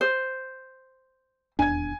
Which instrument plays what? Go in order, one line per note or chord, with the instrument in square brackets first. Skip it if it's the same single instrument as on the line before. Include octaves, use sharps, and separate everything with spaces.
[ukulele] C5
[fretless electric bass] D#1 E2 D4 [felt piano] G#5 G#6